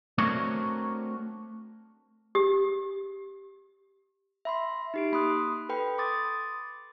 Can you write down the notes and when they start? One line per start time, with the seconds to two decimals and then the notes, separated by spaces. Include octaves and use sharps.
0.18 A3 C4 D4 F#4 A#4 C#5
2.35 G4
4.45 E5 B5 C6
4.94 D#4 G4 D7
5.12 A#3 B5 C6 D#6 F#6
5.69 A4 B4 G5 B5
5.98 C6 D6 D#6 A6